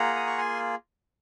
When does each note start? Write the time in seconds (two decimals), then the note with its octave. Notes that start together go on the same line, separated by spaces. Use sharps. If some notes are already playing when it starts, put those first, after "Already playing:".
Already playing: A#3 F4 G#4 F#5 A#5
0.16 D#6
0.26 C#6
0.38 G#5 C6